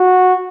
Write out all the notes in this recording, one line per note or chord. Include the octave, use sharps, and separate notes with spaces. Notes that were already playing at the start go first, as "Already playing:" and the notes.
Already playing: F#4